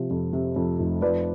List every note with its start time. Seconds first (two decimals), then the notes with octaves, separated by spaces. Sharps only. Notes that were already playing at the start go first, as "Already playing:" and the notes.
Already playing: C3 F3
0.10 F2
0.33 C3
0.56 F2
0.79 F1
1.02 F3 B4 D5